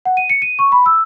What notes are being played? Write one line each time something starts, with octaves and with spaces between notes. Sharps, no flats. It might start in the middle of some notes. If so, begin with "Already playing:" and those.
F#5
D#7
C#7
D#7
C#6
B5
E6